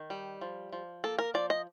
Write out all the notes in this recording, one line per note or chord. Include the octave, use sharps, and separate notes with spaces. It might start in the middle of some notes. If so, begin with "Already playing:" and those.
Already playing: D#3
G3
F3
F3
A#3 A4
A#4
F3 D5
D#5